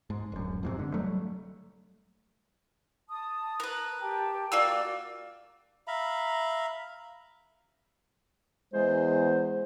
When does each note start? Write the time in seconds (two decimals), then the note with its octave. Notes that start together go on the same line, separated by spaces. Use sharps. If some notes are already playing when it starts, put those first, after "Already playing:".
0.10 G#2
0.32 D1 F#2
0.63 F2 G#2 C3
0.79 D3
0.94 F#3 G3 A3
3.09 A5 D#6
3.60 A#4 B4
4.00 G4 G5 A5
4.52 A#3 F4 F#4 D5 E6
5.87 E5 F5 A#5 B5
8.74 E2 G#3 C5